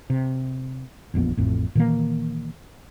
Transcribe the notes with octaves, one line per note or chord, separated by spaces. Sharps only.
C3
E1 A#1 F2 B3
A1 F2 A2
A#2 D#3 E3 A#3